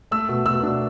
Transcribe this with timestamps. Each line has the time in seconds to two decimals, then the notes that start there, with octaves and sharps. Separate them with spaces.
0.11 A3 E6
0.29 B2
0.45 B2 E6
0.63 D4